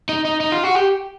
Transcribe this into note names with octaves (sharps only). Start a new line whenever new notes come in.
D#4
D#4
D#4
F4
F#4
G4